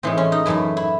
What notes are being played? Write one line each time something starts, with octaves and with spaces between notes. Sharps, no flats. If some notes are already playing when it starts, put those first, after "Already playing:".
A2 E3 G#3 C4
C#4
D#4
F#2 E3 A3 E4
E4